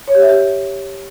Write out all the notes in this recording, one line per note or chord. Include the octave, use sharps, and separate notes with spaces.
C#5
G4
E5
G4